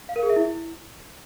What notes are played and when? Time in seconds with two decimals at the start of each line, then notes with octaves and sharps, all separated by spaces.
0.09 F5
0.16 A#4
0.23 G#4
0.30 E5
0.36 E4